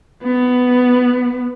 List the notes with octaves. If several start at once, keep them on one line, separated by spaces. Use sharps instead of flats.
B3